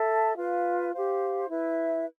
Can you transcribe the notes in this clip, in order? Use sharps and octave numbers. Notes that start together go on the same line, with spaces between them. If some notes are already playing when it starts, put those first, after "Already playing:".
Already playing: A4 E5 A5
F4 B4 F5
G4 C5 F5
E4 B4 E5